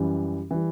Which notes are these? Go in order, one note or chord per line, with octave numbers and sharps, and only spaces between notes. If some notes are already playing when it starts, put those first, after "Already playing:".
Already playing: F#2 E3 G3
E3 G3